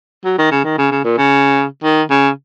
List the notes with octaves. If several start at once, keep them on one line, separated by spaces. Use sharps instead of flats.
F#3
D#3
C#3
D#3
C#3
C#3
A#2
C#3
D#3
C#3